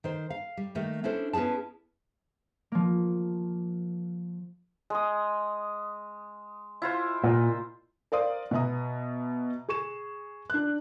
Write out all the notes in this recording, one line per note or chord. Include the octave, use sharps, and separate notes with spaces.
D#3 C5
F5
G3
D#3 A3 A#3
C#4 D4 E4 A4 C5
B3 C#4 E4 G#4 A5
F3 A#3
G#3 D#6
E4 F4 C5
A#2
A#4 C5 D5 F5 C6 D#6
B2 B3 E5 A#5 D#6
G#4 C#6 E7
D4 F#6